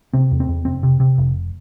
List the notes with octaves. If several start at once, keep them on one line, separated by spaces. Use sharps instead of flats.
C3 C4
E2
C4
E2
F1 C4
C3
C3
F1